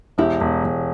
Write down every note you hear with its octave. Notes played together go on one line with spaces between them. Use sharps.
E1 E4 G4
E1
E1